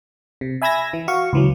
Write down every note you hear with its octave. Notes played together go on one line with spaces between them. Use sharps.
C3
E5 G#5 B5 E6 G#6 A#6
E3
F#4 F5 C#6
C#2 E3 F#3